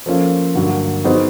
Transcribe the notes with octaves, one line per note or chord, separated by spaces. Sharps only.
F3 A#3 C#4 F4 A4
G2 D3 F#3 A#3
F#3 B3 D#4 G#4 C5